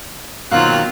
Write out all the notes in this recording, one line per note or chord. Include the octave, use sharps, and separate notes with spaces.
B2 D#3 F#3 A#3 C4 F4 F5 F#6